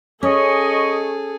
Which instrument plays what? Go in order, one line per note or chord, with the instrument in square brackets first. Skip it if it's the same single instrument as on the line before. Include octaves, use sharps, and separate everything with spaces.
[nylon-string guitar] C#4 [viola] G#4 A4 [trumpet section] D#5 C#6